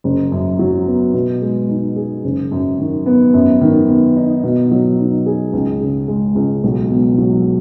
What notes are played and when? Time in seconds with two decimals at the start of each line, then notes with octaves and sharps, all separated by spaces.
0.04 F#1
0.32 F#2
0.59 F#3
0.87 B3
1.14 B2
1.42 G#3
1.69 D#4
1.96 G#4
2.24 F#1
2.52 F#2
2.79 D#3
3.06 B3
3.34 F#2
3.61 D#3
3.88 B3
4.16 D#4
4.44 B2
4.71 F#3
4.99 D#4
5.26 G#4
5.53 C#2
5.81 C#3
6.08 G#3
6.35 C#2
6.64 B1
6.91 B2
7.18 F#3